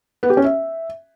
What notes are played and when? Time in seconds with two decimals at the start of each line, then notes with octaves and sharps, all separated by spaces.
0.23 B3
0.30 G4
0.37 C#4
0.44 E5